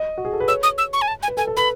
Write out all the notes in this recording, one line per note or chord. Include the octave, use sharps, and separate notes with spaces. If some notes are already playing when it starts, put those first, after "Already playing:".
Already playing: D#5
F#4
G#4
A4
B4
C#5 E6
D#6
E6
C#6
G#5
A5
G#5
B4
A4 G#5
A4
B4 B5